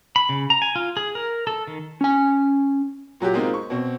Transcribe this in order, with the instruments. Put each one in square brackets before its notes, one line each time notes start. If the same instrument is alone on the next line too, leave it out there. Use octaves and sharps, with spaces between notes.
[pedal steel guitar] B5
C#3
A#5
G#5
F4
G#4
A#4
A4
D#3
[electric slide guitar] C#4 G#5
[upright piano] A#2 F#3 F#4 G4
G#3 A#3 C4 D#4 F4
C#6
B2 C4